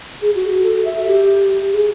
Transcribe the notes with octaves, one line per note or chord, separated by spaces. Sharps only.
G#4
F#4
A4
E5
G4
G#4